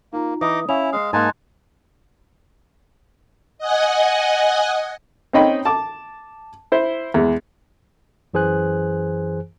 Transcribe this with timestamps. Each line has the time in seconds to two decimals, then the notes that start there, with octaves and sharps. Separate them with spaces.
0.13 A#3 D#4 F4 A#5
0.41 E3 D#4 D#5 D6 D#6
0.69 C#4 E4 F5 G#5 F7
0.93 G#3 F5 D#6 C7
1.13 G#2 A#3 D#4 G#5 A5 C6 F#6
3.58 D#5 F#5 G#5
5.33 C4 C#4 D#4 D#5 G5 B5
5.65 A5 D6
6.72 E4 C5
7.14 E2 G#3
8.34 F#2 E3 G#4 C5 G#5 F#6